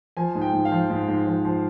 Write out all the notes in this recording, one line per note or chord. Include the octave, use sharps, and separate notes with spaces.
F3 G#5
G#2
G5
G#2
F5
F3
G#2
G#2
F3
F3